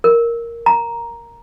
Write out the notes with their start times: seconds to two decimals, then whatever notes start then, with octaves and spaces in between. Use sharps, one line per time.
0.04 A#4
0.66 A#5